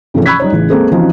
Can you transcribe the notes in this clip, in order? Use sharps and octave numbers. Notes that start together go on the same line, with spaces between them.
G#2 C3 E3 F3 A3 C#4
B5 C#6 E6 F#6 G#6 B6
G3 D#4 C#5
A1 C#3 E3
G#3 A#3 C4 A4
E3 F3 C4 C#4 D#4 F#4